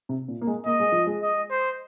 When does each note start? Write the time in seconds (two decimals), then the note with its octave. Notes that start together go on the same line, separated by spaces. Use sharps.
0.09 C3
0.28 A#2
0.41 A#3
0.47 G#3
0.66 A#3 D#5
0.80 G#3
0.92 F3
1.07 G#3
1.23 D#5
1.51 C5